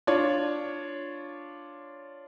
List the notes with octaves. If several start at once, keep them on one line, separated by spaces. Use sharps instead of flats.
D4 F4 C#5